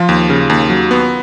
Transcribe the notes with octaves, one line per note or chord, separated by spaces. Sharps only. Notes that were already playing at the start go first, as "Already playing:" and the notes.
Already playing: F3 F4
D#2
C#3
D#2
F#3
B3